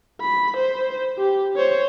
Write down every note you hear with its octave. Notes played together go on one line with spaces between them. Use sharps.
B5
C5
G4
C5 C#5